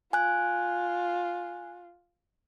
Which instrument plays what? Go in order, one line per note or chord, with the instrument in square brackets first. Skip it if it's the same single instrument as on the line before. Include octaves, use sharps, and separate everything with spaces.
[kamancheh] F4 [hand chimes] G#5 F#6